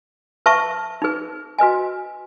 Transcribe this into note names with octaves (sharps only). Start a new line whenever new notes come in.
B4 E5 A5 C#6
D#4 G#4 B4
F#4 B4 D#5 G#5